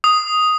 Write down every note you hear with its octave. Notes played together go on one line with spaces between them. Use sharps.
D#6